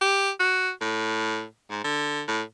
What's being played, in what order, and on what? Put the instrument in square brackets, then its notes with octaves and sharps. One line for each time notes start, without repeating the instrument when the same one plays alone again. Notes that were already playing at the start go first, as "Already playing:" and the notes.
[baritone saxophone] G4
F#4
A2
G#2
D3
A2